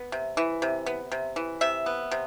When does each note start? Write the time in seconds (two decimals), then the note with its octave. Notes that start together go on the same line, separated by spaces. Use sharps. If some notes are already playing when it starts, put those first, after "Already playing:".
Already playing: B3
0.12 C3
0.37 E3
0.62 C3
0.86 B3
1.12 C3
1.36 E3
1.61 C3 E5
1.86 B3
2.11 C3